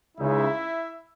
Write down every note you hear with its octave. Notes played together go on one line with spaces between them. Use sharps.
C#2 C#3 G#3 D#4 E4 E5